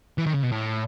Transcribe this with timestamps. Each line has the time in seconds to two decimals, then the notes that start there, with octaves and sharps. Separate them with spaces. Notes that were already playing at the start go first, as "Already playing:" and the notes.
0.18 E3
0.26 D#3
0.34 C#3
0.43 B2
0.52 A2